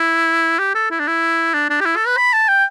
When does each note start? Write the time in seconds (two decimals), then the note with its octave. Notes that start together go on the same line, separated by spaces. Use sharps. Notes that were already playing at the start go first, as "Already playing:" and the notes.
Already playing: E4
0.59 G4
0.75 A4
0.91 E4
1.00 D4
1.07 E4
1.54 D4
1.70 D4
1.80 G4
1.85 E4
1.96 A4
2.07 B4
2.17 B5
2.33 A5
2.48 G5